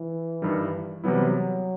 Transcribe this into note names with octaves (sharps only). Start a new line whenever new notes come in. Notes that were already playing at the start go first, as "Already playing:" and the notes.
Already playing: E3
G2 D#3 G3
C3 E3 F#3 G3 B3 E4